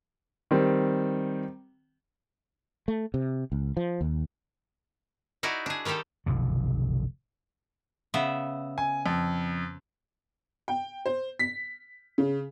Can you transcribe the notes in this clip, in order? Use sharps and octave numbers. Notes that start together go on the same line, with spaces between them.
D#3 G3 C4
A3
C3
C#2
F3
D#2
D#4 E4 F#4 D5
D4 G#4
D#3 G3 D#4 G4 A4
F1 B1 F#2 D3
C#3 B3 E5
G#5
F2
G5
C5
B6
C#3